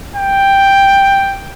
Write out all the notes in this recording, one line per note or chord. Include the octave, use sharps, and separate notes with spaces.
G5